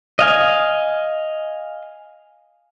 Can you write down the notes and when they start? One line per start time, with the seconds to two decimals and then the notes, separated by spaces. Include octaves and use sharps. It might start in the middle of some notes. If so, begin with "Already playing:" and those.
0.19 D#5 F5 G#5